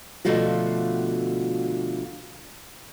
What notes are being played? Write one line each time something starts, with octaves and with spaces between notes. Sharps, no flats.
B2 D3 F3 A3 F4 F#4